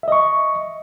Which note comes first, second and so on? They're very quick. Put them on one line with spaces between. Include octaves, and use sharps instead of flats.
E5 D#5 C#6